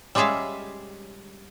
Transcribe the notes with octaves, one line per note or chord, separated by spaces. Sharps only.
G3 G#3 C#4 G#4 E5 F5